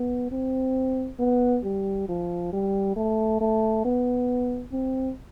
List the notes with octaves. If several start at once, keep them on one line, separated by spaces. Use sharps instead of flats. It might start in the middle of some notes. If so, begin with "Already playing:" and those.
Already playing: B3
C4
B3
G3
F3
G3
A3
A3
B3
C4